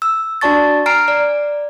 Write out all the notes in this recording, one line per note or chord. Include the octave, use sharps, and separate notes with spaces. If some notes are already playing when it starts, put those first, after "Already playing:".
E6
D4 F#4 D5 A5 C#6 A6
G#5 A#5 F6 C7 D7
D5